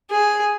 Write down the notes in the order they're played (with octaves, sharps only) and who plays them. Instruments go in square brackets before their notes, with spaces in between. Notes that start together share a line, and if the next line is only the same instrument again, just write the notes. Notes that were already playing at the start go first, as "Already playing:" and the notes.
[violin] G#4